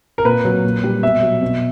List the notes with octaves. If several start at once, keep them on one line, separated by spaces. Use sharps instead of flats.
A#4
A#2 B4
F#3
A#2
G3
B2 E5
F#3
B2